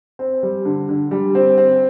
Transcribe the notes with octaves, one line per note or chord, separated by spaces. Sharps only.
C4
G3
D3
D3
G3
C4
C4